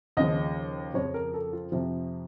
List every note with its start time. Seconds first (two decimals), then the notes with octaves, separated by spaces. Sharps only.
0.17 D#2 C#3 F3 D#5
0.94 F2 C#3 F3 C#5
1.14 A#4
1.34 A4
1.53 F4
1.72 F2 C3 F3